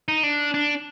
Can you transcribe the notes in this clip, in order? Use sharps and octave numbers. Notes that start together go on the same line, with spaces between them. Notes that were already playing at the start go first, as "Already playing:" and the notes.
D#4
D4
D4